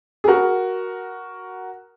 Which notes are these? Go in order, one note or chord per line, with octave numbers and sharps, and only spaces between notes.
G#4
F#4 A#4